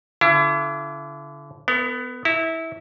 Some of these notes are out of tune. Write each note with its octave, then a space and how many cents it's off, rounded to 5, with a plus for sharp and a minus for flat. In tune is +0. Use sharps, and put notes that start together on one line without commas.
D3 -30 E4 +35
B3 +20 A#4 -35
E4 -20 A#5 -30